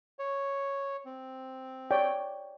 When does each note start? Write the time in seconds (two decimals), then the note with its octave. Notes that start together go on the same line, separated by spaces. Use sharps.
0.19 C#5
1.05 C4
1.91 C#5 D5 G5